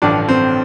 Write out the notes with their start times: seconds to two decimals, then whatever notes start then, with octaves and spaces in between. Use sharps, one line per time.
0.02 A1 G2 D3 F3 D4
0.29 C4